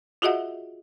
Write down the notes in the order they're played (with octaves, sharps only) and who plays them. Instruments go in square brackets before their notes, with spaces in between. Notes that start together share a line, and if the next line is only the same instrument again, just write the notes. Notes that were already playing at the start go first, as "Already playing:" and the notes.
[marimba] F4 F#4 G#4 D#5 E5 F#5